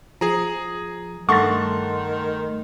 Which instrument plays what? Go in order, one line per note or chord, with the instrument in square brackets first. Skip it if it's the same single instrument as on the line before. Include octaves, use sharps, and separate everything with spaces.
[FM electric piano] F3 [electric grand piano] G#4 A#5
[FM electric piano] G2 A3 C6 [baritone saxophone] D#3 [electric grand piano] F#5 A5 [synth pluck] C#6 A6